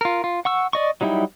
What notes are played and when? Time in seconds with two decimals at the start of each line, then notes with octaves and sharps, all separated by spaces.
0.01 F4 A#4
0.24 F4
0.45 F#5 C#6 E6
0.73 D5 D#5 C#6
1.01 F#3 G3 D#4 E4 G4